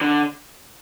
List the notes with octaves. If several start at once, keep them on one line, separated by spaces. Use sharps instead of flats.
D3